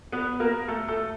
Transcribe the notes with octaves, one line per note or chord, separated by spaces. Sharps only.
B3 B4
A#3 A#4
A3 A4
A3 A4